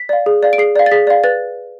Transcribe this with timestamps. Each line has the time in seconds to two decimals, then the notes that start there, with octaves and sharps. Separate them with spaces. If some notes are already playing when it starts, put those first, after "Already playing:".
Already playing: B6
0.09 D5 F5
0.26 G#4
0.43 D5 F5
0.53 D7
0.58 G#4 C7
0.76 D5 F5
0.86 A6
0.92 G#4 B6
1.07 D5 F5
1.24 B4 A6